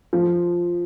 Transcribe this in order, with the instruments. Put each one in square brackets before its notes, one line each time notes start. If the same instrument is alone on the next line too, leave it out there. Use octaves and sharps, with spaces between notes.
[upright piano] F3